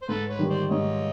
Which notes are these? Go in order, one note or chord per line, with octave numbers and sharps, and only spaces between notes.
C5
G#2 A4 B4
B4 C#5
D#3 G3
C5 D5
G#2 C#5 D#5